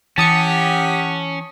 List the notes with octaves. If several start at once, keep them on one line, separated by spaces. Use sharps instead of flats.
E3 C#4 G4 F#5 A5 D#6 C#7